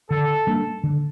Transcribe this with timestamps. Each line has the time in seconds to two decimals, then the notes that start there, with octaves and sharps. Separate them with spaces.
0.11 D3 A4
0.47 G3 A#3 D4
0.84 D3